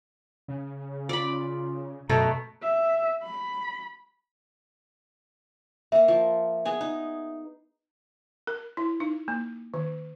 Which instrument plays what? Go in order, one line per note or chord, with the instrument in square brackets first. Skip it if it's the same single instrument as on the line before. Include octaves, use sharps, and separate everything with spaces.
[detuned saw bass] C#3
[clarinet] F4 [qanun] D5 B5
[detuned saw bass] F#2 [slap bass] B2 [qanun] A3 [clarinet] A#5
[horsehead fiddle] E5
B5
[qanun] A#3 A#4 [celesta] E5
[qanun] F3
B3 G#4 G#5
D#4
[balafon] A#4
E4
D#4
A#3
D#3